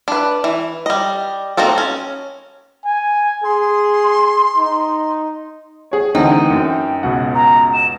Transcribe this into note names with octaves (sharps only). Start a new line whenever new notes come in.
D4 B4
E3
G3 D#5
A#3 C4 D#4 F#4 A4
C#4
G#5
G#4 C6
D#4
G#4 C#5
D2 E3 C4 D#4 F#5 G5
F#2
C#2 B2 F#5
A#5
E7